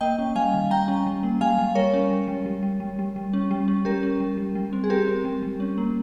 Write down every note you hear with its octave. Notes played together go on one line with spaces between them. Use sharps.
A#3 D#5 G5
C#4
G3 F5 G#5
D#3
G3 G5 A#5
C#4
G3
A#3
G3 F5 G#5
G3
G3 A#4 C#5
C#4
G3
G3
G3
G3
G3
G3
G3
C#4
G3
C#4
G3 G4 A#4
C#4
G3
G3
G3
C4
G#4
C4 G4 A#4
C4
G3
G3
C#4
A#3